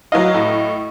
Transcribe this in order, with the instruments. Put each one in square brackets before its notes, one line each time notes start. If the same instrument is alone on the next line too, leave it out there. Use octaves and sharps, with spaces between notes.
[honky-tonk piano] F#3 E4 F5 [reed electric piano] D#5
[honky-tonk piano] A2